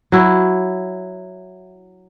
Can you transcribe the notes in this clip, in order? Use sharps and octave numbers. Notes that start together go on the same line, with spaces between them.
F#3 E4